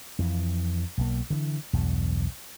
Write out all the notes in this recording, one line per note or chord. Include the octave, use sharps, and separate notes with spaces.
F2 E3
B1 A#3
D3 E3
B1 E2 G2